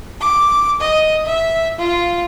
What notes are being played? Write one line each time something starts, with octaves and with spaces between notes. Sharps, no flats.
D6
D#5
E5
F4